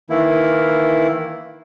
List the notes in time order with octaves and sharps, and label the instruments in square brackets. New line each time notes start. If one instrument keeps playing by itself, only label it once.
[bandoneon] D#3 E3 A#3 E4